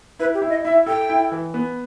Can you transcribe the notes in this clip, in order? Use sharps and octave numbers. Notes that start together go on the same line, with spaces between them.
E4 B4
G4
E4
D#5
E4 E5
A4 G5
E4
E3
B3